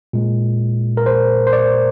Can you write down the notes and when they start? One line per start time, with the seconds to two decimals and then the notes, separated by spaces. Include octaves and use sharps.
0.13 A#2 G#3
0.97 A#4
1.06 C5
1.47 C5
1.53 D5